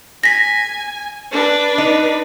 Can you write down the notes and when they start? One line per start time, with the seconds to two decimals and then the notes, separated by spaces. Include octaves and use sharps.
0.24 G#5 A#6 B6
1.32 D4 B4
1.78 D#4